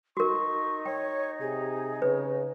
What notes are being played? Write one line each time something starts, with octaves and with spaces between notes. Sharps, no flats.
D#4 F#4 A#4 C#6
C#5 G5
C3 G#4
C#3 B4